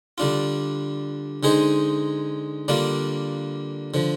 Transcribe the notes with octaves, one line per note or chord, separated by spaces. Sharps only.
D3 G3 D4 F4
D3 G#3 D#4 G#4 C5
D3 G3 A#3 D4 F4
D3 F3